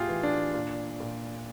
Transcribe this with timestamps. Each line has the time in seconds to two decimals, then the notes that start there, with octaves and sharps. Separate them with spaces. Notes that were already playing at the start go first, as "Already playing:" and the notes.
Already playing: A2 F4 G4 G#4
0.09 E3
0.23 D4
0.54 A#2
1.00 A#2